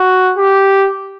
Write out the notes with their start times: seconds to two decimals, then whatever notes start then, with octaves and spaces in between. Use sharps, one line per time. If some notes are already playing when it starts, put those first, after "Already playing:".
Already playing: F#4
0.37 G4